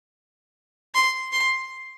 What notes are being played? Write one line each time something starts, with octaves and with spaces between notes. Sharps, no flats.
C6
C6